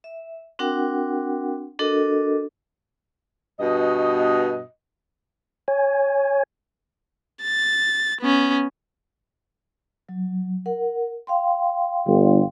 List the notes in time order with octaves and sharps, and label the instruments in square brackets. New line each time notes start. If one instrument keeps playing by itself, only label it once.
[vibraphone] E5
C4 D4 F#4 A#4 F#5 G5
D4 F#4 A4 A#4 D#5
[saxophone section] G2 B2 D#5
[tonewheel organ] C#5 G#5
[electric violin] A6
B3 C#4
[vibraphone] F#3
A#4 F#5
F5 G5 C6
[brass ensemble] G1